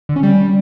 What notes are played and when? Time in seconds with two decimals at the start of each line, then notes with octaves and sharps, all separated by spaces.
0.09 D3
0.16 C#4
0.23 G3